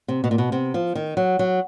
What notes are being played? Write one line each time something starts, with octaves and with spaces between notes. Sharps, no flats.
C3
B2
A#2
B2
C3
F3
D#3
F#3
F#3